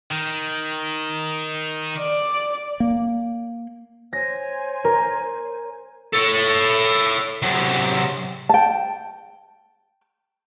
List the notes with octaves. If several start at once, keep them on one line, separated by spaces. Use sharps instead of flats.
D#3
D5
A#3
C5 C#5 G#5 A#6
A#4
A4 C#5
C3 F#3
G5 A5